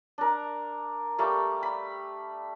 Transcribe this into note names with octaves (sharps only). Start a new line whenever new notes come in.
D4 A#4
G3 A3 A#3
B5